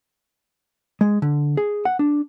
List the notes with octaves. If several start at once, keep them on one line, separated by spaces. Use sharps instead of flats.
G#3
D3
G#4
F#5
D4